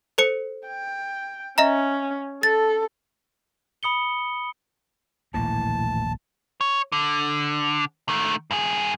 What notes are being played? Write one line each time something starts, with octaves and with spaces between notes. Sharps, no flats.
A4 C5 C#7
G5
C#4 D#5 E5 A#5
A4 A6
B5 D#6 C#7 G7
D#1 A#1 A2 E3 A#3 A5
C#5
D3
D#3 A3
G2 G#4